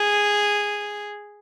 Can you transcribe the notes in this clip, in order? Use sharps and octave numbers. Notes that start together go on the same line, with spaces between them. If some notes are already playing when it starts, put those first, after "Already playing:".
Already playing: G#4